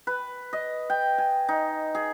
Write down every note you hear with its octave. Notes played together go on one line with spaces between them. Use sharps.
B4
D#5
G5
G#5
D#4
G#4